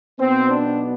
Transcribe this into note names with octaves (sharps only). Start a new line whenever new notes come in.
B1 B2 B3 C4
D4